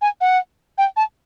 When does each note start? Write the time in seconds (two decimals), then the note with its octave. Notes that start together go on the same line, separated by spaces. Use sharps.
0.02 G#5
0.21 F#5
0.78 G5
0.97 A5